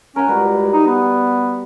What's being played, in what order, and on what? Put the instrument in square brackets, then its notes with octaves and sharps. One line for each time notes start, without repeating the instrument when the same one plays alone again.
[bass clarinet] C#4 [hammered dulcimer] A#4 F#5
[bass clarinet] C#2 [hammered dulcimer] G3 F#4 B4
[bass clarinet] D#4
B3